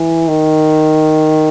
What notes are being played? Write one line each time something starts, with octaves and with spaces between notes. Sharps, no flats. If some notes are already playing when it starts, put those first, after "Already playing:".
Already playing: E3
D#3